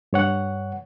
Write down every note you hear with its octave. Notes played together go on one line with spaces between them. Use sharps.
G2 C#5 F#5